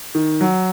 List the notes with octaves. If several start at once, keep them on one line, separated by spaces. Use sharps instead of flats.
D#3
F#3